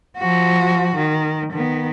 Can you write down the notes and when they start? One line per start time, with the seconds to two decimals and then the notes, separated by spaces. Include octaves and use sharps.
0.17 F3 F#4
0.97 D#3
1.53 D#3 B3